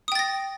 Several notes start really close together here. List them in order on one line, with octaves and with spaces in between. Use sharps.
D#6 G5 A6 A#6